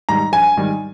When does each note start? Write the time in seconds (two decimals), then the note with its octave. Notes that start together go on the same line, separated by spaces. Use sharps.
0.09 G#2 D#3 G3 A#5
0.32 A#1 G#5
0.57 G#2 D#3 G3